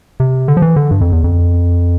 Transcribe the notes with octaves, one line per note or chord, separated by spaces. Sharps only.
C3
D3
F3
E3
D3
G2
F2
E2
F2